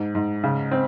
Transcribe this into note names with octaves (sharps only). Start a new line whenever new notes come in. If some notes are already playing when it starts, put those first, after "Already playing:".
Already playing: G#2
G#2
C#3
C4